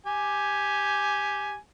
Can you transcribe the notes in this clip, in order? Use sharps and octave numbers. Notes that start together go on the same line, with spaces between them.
G4 G#5